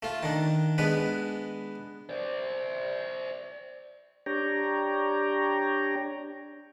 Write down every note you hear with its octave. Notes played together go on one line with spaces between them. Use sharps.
A3 F4
D#3 D4
G#3 B3 D4 B4
C5 D5
D4 G4 C#5 G5 A#5